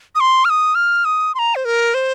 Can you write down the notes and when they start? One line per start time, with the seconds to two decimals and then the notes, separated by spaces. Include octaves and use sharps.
0.15 D#6
0.20 C6
0.45 F6
0.50 D#6
0.75 F6
1.05 D#6
1.35 C6
1.39 A#5
1.55 C5
1.65 A#4
1.94 C5